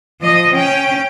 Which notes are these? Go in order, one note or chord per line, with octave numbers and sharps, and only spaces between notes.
F3 D#5
C#4 G5